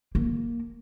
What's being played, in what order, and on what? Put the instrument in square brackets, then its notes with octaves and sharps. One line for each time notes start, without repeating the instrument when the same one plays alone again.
[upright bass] A#3